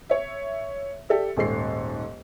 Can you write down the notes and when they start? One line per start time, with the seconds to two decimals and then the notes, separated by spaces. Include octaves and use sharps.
0.09 C#5 E5
1.09 G4 A4 D5 E5
1.37 D#1 G#2 A4 C7